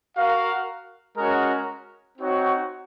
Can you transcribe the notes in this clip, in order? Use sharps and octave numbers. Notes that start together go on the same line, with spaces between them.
F#4 A#4 F5
G#3 C#4 F#4 A#4
C4 D#4 F#4 C#5